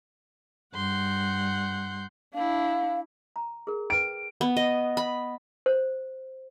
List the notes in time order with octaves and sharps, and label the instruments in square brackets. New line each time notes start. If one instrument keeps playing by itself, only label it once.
[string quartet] G2 F#5 C6 G6
[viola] D4 E4 [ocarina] F5
[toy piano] A#5
G#4 A#4
[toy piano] B4 G5 [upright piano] D7
[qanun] B3
D#5
B5
[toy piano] C5